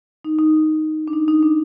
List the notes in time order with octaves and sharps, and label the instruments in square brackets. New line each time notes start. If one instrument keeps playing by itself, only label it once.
[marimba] D#4
D#4
D4
D#4
D#4
D4